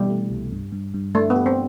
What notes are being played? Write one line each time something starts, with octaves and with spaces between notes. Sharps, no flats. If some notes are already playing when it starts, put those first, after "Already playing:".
Already playing: B2 E3 G3
A3
C2
G2
G2
G2
A3 D4
B3
G4
C4